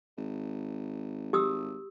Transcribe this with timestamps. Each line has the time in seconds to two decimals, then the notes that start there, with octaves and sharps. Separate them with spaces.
0.17 G#1
1.33 G#1 G4 D#6 E6